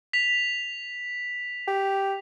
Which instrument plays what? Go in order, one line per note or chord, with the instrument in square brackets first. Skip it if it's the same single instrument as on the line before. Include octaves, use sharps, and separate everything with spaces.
[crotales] B6 F7
[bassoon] G4